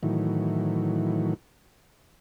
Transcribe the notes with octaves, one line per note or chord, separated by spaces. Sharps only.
A2 D#3 E3 F#3